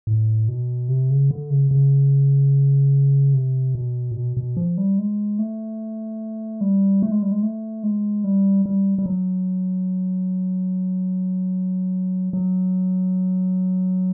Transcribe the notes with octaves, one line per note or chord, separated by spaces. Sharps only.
A2
B2
C3
C#3
D3
C#3
C#3
C3
B2
A#2
B2
B2
F3
G3
G#3
A3
G3
A3
G#3
G3
G#3
A3
G#3
G3
G3
G3
F#3
F#3